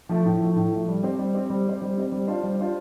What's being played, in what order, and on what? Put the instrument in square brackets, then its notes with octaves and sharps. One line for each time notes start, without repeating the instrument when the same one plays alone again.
[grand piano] F3 A3
A2
F3 A3
A2
F3 A3
G3
C4 G4 C5
G3
C4 G4 C5
G3
C4 G4 C5
G3
C4 G4 C5
G3
D4 F4 C5
G3
D4 F4 C5